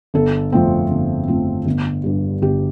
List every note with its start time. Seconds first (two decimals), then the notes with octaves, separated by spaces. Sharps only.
0.14 G1 A4
0.52 F2 F3 A3 C4
0.90 G1
1.28 F2 F3 A3 C4
1.66 G1
2.04 G2 G3
2.42 G1 G4